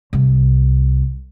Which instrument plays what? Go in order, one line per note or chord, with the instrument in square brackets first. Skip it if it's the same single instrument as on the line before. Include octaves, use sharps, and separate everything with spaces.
[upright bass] C2